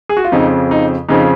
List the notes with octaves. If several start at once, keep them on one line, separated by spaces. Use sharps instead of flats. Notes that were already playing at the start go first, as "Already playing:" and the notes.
G#4
F#4
F4
F2 C#3 F3 D#4
D#4
F2 C#3 F3 D#4